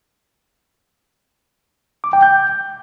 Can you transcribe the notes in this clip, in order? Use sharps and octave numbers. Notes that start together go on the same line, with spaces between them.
D6
G5
G6